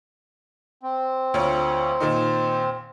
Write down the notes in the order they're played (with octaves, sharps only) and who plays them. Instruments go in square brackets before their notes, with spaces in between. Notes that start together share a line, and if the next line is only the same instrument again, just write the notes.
[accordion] C4
[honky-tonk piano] D2 F4 C#5
A#2 D#3 D#4